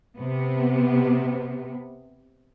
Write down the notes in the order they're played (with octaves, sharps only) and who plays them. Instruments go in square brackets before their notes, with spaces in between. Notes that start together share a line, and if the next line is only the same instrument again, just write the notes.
[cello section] C3 B3